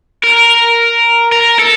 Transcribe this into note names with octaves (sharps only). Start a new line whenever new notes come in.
A#4
A#4
A4